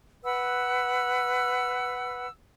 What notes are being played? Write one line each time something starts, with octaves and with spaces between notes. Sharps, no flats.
B4 F#5 E6